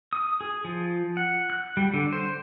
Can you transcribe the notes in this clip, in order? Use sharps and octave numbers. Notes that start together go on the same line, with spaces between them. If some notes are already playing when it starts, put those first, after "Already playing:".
D#6
G#4
F3
F#5
F#6
G3
D3
C5